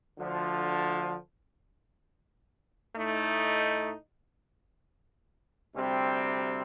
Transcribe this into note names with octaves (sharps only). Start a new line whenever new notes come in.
D2 D3 F3
A2 A3 D#4
D2 C3 G3 C4